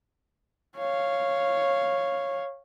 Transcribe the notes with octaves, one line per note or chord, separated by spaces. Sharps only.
C#5 F5